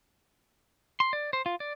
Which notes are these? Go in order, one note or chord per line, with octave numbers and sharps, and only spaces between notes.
C6
D5
C5
F4
D5